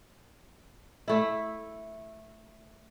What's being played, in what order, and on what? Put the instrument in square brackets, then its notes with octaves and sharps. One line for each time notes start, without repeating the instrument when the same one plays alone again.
[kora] A3 E4